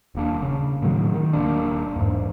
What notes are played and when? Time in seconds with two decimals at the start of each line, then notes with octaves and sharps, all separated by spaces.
0.15 D#1 A#3 D4
0.42 C#3
0.82 A2 D#3 F#3
1.14 D#3
1.33 D#1 F#2 A#3 D4
1.96 E2 G#2